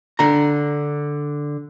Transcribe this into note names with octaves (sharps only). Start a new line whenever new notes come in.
D3 A#5